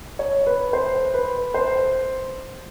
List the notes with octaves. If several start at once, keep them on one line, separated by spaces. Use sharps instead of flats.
C#5
B4
C5
B4
C5